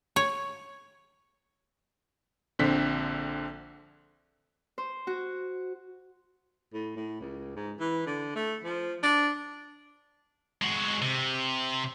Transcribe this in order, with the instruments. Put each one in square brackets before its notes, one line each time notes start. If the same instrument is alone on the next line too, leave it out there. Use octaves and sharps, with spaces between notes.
[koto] C#5
[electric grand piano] A#1 D3 C4 B6
[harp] C5
F#4
[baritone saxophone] A2
A2
C#2
G#2
E3
D3
A3
F3
D4
[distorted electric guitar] G#3 F#4
C3